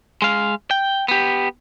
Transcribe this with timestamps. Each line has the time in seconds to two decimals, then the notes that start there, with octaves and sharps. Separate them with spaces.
0.22 G#3 F5
0.71 G5
1.08 B3 G4